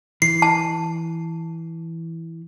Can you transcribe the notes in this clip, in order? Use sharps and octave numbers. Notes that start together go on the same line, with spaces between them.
E3 C7
A5